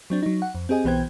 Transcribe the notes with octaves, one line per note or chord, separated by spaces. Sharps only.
F#3 C4 D4
F#3 D#4
F#5
F2
C4 G4 G#4 D#5 G#5
B1 E3 B3 C5 G5 G#6